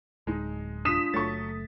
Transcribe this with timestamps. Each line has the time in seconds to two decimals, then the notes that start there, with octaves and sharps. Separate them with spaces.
0.27 D1 G#3 D#4
0.85 D4 F4 D#6 B6 E7
1.14 F#1 F#3 A3 A4 C#6 A6